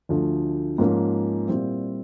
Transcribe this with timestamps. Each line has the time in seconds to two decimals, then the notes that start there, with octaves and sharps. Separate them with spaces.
0.09 D2 D3 F3 A3
0.78 G#2 F3 A#3 C#4
1.47 A#2 G3 C4 E4